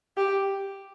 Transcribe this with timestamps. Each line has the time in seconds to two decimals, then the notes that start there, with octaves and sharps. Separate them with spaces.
0.17 G4